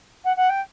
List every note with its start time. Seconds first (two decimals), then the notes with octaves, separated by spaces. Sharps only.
0.24 F#5
0.36 F#5
0.49 G5